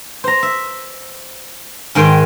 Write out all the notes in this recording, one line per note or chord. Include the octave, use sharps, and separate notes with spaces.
C5 A#5
E5
G#2 D#3 G#3 G5 C6